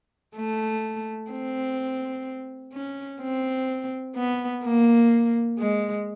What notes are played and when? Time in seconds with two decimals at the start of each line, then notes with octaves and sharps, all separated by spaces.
0.36 A3
1.31 C4
2.73 C#4
3.21 C4
4.15 B3
4.64 A#3
5.59 G#3